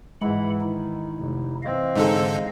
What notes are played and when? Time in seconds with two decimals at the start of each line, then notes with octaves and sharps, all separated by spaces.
0.21 G#2 E3 G#3 F#5 B5
0.61 D#3 D#4 E4
1.19 F1
1.63 E3 C4 D#5 F5
1.96 G#2 D3 G#3 D#4 G#4 A4